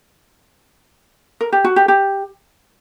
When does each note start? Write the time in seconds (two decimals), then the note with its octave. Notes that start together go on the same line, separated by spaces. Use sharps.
1.41 A#4
1.53 G4
1.64 F#4
1.76 G4
1.88 G4